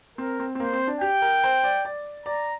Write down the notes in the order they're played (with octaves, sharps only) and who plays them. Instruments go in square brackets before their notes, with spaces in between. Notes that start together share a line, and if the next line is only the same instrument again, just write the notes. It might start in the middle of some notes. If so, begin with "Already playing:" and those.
[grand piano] C4 [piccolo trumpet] A#4
[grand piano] C4
C4
[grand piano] A#3 [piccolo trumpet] C5
[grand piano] C4
D4
[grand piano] G4 [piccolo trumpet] G5
[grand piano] A#4
C5
D5
D5
[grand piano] D5 [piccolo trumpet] A#5